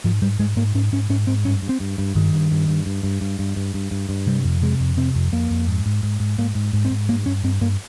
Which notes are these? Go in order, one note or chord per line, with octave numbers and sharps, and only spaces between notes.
G#2 F3
G#2 G3
G#2 G#3
G#2 A#3
G#2 C#4
G#2 C#4
G#2 C#4
G#2 C4
G2 C#4
G2
C4
G2
G2
G2 D#3
G2
G2
G2
G2
G2
G2
G2
G2
G2
G2
G2
C3 G3
F2
C3 G#3
F2
C3 C4
F2
F2 A#3
F2
G#2
G#2
G#2
G#2
G#2 A#3
G#2
G#2
C4
G#2
G2 A#3
G2 C#4
G2 C4
G2 A#3